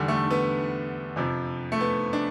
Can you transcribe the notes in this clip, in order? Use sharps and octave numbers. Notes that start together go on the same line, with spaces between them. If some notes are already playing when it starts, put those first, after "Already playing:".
Already playing: E2 D3 G3
A3
B3
F2 C3 F3
A3
B3
D4